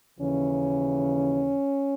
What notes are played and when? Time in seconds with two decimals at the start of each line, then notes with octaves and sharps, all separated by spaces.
0.19 D#2 C#3 E3 C#4